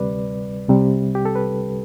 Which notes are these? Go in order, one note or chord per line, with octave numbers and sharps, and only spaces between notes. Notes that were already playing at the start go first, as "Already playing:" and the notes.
Already playing: D2 C3 G3 B4 D5
C2 C3 G3
G4
A4
B4